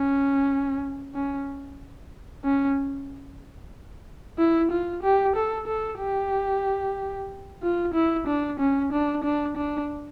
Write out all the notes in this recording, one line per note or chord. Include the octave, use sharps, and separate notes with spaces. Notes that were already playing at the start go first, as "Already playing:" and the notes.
Already playing: C#4
C#4
C#4
E4
F4
G4
A4
A4
G4
F4
E4
D4
C#4
D4
D4
D4